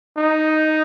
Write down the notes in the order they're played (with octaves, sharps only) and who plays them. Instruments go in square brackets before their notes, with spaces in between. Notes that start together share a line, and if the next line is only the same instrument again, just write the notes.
[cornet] D#4